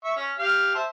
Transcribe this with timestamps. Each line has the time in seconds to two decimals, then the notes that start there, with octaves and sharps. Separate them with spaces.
0.04 E5 C#6
0.17 C#4
0.39 G4 F5
0.75 C5 E5 A5